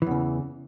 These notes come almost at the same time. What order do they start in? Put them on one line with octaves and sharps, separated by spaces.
E3 E2 C#3